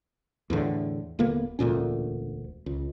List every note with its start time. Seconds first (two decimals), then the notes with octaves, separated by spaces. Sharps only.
0.50 E2 A2 D3
1.19 D#1 D3 A#3 B3
1.59 E1 D2 A#2 C#4
2.66 C#2